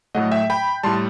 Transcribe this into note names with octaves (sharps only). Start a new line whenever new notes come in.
A2 F#3 A3 D#5 F#5
E5 G5
G5 B5
A2 G3 A5 C6